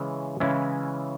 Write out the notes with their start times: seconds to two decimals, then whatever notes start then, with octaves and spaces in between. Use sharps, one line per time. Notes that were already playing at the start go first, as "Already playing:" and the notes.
Already playing: C#3 E3 G#3 C#4 E4
0.40 C#3 E3 G#3 C#4 E4